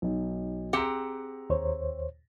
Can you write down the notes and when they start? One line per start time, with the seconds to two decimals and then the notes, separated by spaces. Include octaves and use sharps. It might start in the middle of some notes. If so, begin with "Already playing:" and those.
0.02 B1 D#4
0.73 C4 G4 G#4 F#5 A#5
1.50 D#2 C5 C#5